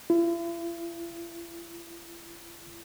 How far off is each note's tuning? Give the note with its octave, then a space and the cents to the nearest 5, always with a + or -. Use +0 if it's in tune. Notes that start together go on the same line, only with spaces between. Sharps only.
E4 +45